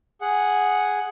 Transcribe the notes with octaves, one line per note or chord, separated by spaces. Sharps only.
G#4 F#5